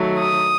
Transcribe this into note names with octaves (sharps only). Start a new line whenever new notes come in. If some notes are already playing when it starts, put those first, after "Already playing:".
Already playing: D#3 F#3 A3
D#6